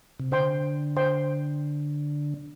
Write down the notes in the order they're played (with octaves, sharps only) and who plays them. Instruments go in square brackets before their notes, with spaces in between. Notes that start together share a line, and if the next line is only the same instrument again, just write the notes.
[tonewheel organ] C3
[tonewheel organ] D3 [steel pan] C5 G5 C6
[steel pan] C5 G5 C6